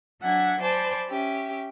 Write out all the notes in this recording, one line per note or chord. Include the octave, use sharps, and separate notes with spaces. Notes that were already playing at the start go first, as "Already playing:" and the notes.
F#3 D4 E5 F#5 G#5 G#6
C5 D5 G#5 A5 B5
C#4 G4 E5